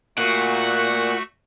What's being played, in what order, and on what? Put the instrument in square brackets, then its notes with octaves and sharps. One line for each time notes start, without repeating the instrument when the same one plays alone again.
[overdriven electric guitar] A#2 [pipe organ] A3 F#4 [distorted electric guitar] F#5